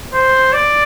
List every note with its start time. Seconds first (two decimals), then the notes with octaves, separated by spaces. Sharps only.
0.13 C5
0.53 D5